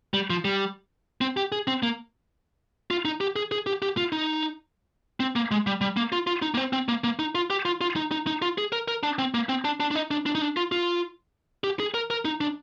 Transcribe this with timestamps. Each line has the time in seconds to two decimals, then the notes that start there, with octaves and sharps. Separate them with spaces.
0.14 G3
0.30 F3
0.45 G3
1.21 C4
1.37 G4
1.52 G#4
1.67 C4
1.83 A#3
2.91 F4
3.05 D#4
3.21 G4
3.36 G#4
3.52 G#4
3.67 G4
3.82 G4
3.97 F4
4.12 D#4
5.20 C4
5.36 A#3
5.51 G#3
5.67 G3
5.81 G3
5.97 A#3
6.12 F4
6.27 F4
6.42 D#4
6.54 A#3
6.57 C4
6.73 C4
6.88 A#3
7.04 A#3
7.19 D#4
7.35 F4
7.50 G4
7.65 F4
7.81 F4
7.96 D#4
8.11 D#4
8.27 D#4
8.42 F4
8.58 G#4
8.72 A#4
8.88 A#4
9.03 D4
9.19 C4
9.34 A#3
9.49 C4
9.65 D4
9.80 D4
9.91 D4
9.96 D#4
10.11 D4
10.26 D4
10.35 D#4
10.42 D4
10.57 F4
10.72 F4
11.64 G4
11.80 G#4
11.94 A#4
12.10 A#4
12.25 D#4
12.41 D4